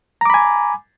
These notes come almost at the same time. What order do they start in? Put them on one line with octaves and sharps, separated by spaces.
A#5 D6 B5 G#5